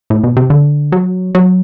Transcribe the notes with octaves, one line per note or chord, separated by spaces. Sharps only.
A2
B2
C3
D3
F#3
F#3